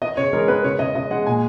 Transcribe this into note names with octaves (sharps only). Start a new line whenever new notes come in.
B3 D#5
C#3 C#5
G#3 A#4
B3 B4
C#3 C#5
C#3 D#5
C#3 D#5
G#3 F#5
A#2 G#5